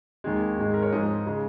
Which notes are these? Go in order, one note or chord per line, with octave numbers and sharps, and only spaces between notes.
D#2 D#3 G#3
G#2 G#3
A#4
C#5
G#2 F3 G#3 D#5
C#3 G#3